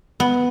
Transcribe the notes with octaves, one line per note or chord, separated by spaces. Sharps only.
B3